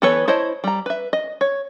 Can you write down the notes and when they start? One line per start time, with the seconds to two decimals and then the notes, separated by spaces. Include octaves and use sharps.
0.02 E3 B3 A4 B4 C#5
0.28 E4 C5 C#5 D#5 A5
0.64 G3 A#5
0.86 B4 E5
1.13 D#5
1.41 C#5